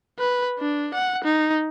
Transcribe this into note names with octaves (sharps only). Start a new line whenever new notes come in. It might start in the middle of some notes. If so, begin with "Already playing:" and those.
B4
D4
F#5
D#4